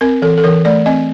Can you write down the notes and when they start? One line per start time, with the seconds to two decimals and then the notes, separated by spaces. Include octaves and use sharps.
0.01 C4 A#4
0.22 E3 A4
0.38 A4
0.44 E3 A#4
0.65 A3 D5
0.86 C4 D#5